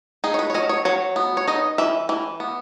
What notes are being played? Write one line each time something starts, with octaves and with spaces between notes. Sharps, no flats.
D#4 G#4
C#5
B4
C#5
F#3 D#5
C#5
F#3 C#5
B3
C#5
D#4 D#5
E3 E5
E3
B3